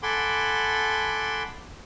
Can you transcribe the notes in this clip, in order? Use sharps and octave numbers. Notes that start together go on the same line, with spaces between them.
A4 F#5 G#5 B5 C6 D6